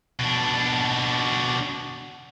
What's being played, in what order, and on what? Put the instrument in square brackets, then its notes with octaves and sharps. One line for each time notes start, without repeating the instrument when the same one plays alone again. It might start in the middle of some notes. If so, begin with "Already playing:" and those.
[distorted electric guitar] B2 D4